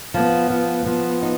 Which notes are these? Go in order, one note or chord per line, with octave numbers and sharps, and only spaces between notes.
F3 B3
F3
F3 B3
D#4